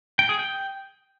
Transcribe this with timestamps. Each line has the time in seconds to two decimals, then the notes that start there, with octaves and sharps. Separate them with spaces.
0.19 G5
0.29 G#4
0.39 G5